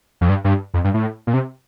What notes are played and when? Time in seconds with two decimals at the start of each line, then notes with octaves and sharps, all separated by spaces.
0.21 F2
0.29 G2
0.44 G2
0.74 F2
0.84 G2
0.94 A2
1.27 A#2
1.34 C3